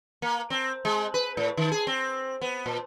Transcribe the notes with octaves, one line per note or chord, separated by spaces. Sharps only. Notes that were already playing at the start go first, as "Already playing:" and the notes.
A#3
C4
G#3
B4
A2
D#3
G#4
C4
B3
A#2